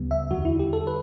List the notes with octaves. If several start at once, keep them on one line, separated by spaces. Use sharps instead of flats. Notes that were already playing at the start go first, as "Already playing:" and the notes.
Already playing: D2 C#3 G3 B3
E5
E2 D3 G3 F#4
E4
G4
A4
B4